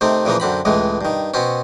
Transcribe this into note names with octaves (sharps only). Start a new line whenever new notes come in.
C3 D#3 A3 C4
A#2 C#3 E3 F3 A#3
F#2 D3 C4 B5
C#2 A2 E3 G#3
G2 D#3
B2 C4 C#4